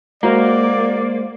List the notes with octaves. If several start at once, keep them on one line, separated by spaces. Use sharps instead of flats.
G#3 A#3 F#4 C5 D5 A#5